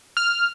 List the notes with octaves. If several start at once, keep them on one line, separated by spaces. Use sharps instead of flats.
F6